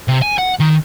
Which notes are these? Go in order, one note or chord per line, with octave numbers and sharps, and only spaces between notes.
C3
G#5
F#5
D#3